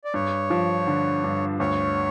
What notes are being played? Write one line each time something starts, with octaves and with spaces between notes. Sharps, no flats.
D5
G2 C#5
F3
D3
G2
D2 C#5